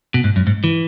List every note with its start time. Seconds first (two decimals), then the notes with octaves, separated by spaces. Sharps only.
0.14 B2
0.24 G#2
0.36 F#2
0.47 G#2
0.64 E3